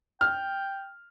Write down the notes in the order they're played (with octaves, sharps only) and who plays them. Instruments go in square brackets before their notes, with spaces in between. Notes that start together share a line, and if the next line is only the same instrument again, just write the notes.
[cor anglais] G5 [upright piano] F6